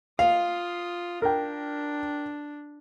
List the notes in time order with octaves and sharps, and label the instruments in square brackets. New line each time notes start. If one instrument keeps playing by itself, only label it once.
[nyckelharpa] F4 D#6 [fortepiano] F5
[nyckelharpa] D4 [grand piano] A#4 G5